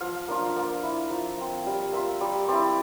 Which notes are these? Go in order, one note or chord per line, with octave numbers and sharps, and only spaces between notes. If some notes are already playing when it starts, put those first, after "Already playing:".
F3 F5
A#3 D4 F4
A#3
E4
F3 E5
C4 F4
G3 F5
A#3 F4 E5
G3 D5
C4 E4 D5